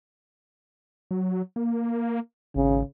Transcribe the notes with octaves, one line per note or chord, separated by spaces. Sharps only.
F#3
A#3
G#1 C#3